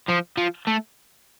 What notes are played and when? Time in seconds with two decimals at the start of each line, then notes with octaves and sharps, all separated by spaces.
0.08 F3
0.37 F3
0.67 A3